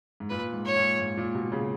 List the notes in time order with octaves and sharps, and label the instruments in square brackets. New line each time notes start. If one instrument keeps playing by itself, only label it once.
[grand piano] G#2
[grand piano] A#2 [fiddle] B4
[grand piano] G#2
[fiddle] C#5
[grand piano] A#2
G#2
A#2
B2
C#3